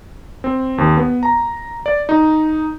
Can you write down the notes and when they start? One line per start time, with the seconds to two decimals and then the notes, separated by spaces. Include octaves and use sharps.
0.44 C4
0.78 D#2
0.97 B3
1.23 A#5
1.86 D5
2.09 D#4